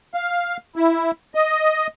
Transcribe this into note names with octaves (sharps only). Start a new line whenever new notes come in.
F5
E4
D#5